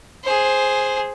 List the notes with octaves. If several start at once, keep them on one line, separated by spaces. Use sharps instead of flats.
G#4 C5